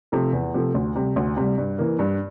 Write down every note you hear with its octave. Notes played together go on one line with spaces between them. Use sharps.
C3 F3 A3
E2
C3 F3 A3
D2
C3 G3
D2
C3 G3
G2
E3 A#3
G2